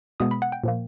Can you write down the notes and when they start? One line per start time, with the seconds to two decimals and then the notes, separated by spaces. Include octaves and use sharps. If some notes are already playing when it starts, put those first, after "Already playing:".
0.20 B2 G#3 B3 D#6
0.31 B5
0.42 F#5
0.52 G5
0.64 A#2 F3 A#3